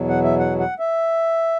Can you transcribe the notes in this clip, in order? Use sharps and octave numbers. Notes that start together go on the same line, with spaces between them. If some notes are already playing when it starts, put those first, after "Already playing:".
Already playing: E2 B2 F#3
F#5
E5
F#5
F#5
E5